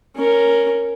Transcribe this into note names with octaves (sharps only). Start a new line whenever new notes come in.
C#4 A#4